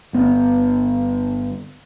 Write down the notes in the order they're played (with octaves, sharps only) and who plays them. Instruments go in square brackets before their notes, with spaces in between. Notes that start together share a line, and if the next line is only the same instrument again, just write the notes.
[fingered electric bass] G1 B3